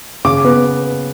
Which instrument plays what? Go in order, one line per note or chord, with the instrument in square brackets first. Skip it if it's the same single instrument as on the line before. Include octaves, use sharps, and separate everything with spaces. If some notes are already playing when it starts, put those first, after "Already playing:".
[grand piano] C#3 D6
B3